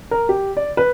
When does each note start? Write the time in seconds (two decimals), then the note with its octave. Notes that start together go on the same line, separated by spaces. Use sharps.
0.11 A#4
0.29 G4
0.57 D5
0.77 B4